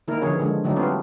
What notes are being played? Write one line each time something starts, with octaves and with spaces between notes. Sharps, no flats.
D#3 A#3 E4 A#4
D3 E3 F3 C#4 G#4 C#5
D3 F3 G#3
D3 F#3 A3 D4 D#4
G3 A3 B3 C4 F4